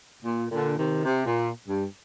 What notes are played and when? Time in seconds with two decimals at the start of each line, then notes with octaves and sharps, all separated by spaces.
0.23 A#2
0.50 A#2 D3
0.77 C3 D#3
1.05 C3
1.26 A#2
1.68 G2